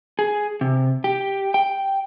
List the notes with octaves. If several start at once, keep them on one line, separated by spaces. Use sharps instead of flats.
G#4
C3
G4
G5